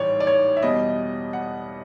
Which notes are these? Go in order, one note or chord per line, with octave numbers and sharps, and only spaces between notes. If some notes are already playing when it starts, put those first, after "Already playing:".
Already playing: A1 G#2 E3 G3 C#5 D5
D5
C#5
E5
E2 B2 G3 D#5
F#5